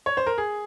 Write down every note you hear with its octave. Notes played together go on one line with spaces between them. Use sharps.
C#5
C5
A#4
G#4